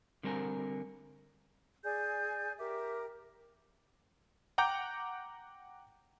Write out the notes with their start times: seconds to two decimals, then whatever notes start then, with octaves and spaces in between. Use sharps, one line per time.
0.23 D3 G3 C4 A#4 G#5
1.84 G#4 D5 G#5 G6
2.58 G4 A#4 E5 D6
4.58 F#5 G5 A#5 D6 G6